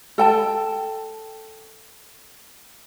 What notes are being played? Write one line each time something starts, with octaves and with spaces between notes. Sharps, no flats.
A4 G5 A5